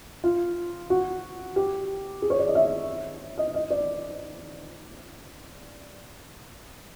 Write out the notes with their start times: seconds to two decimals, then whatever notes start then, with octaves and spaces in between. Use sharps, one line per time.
0.24 F4
0.90 F#4
1.56 G4
2.22 G#4
2.30 C#5
2.39 D5
2.48 D#5
2.55 E5
3.38 D#5
3.54 D#5
3.70 D5